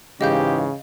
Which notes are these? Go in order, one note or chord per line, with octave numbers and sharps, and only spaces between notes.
G#2 C#3 E3 G#3 G4 D#5 F5 G6